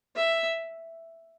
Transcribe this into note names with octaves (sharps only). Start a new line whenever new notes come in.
E5